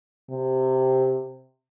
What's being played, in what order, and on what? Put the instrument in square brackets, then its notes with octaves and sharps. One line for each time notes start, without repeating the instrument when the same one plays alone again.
[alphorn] C3